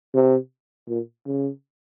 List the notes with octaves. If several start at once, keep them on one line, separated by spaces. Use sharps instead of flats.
C3
A#2
C#3